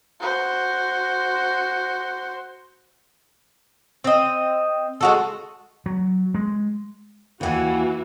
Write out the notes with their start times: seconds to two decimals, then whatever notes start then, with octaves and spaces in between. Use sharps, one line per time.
0.21 F#4 C5
4.04 C4 D#5
5.01 G#3 F#4 A4
5.86 F#3
6.34 G#3
7.41 D#2 E3 F#4 F#5 G#5